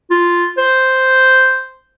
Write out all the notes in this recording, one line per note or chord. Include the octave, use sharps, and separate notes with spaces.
F4
C5